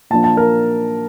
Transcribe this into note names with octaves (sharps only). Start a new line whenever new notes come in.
A#2 F3 A#3 D4 A5
A5
A#4